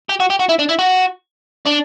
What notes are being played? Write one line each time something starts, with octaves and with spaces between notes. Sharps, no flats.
G4
F#4
G4
F#4
E4
D4
E4
F#4
D4